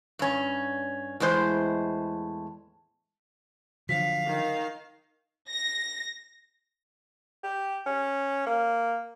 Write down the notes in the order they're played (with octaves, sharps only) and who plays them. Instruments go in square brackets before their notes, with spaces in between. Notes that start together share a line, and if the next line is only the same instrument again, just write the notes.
[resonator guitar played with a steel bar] G2 C#4
E2 A2 G#3 C5
[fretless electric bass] D3 F3 F#3 [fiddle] F5 [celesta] B6
[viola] D#3
[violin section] A#6
[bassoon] G4
C#4
A#3